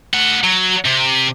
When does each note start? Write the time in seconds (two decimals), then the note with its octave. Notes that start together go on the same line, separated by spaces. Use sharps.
0.14 A3 F#5
0.43 F#3
0.85 C3